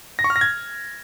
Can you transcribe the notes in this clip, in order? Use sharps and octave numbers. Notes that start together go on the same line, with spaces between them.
A#6
C#6
F6
A#6
G#6